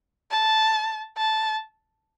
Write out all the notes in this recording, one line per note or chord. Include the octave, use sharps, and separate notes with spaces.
A5
A5